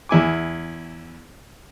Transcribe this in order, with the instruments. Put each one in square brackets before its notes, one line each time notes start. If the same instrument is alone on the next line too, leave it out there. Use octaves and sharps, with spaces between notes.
[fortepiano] E2 E4 G#5 D6